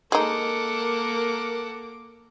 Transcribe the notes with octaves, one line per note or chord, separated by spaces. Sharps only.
G#3 A#3 D#4 A4 A#4 F#5 D6